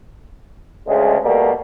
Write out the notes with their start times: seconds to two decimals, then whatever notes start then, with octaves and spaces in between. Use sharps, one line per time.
0.87 D2 C#3 G#3
1.24 B2 G3 A3 A#3